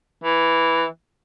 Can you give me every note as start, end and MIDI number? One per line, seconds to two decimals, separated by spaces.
0.24 0.86 52